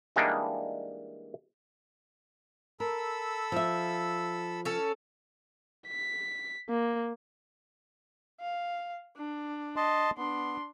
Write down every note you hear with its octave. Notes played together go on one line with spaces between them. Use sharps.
E3 G3 G#3 A#3 D4 D#4
A4 A#4 B5 E6
F3 E5
C#4 A4
B6
A#3
F5
D4
D#5 A5 C6
B3 D4 C6